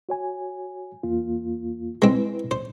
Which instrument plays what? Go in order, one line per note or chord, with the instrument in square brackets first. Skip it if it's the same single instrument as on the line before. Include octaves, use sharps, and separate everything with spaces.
[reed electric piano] F#4 C#5 G#5
E2 A#3 F4
[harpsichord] G#3 C4 [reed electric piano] E4 B4
[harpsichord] C5